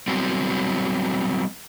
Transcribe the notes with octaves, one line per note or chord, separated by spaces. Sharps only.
F#3 G3 B3 C4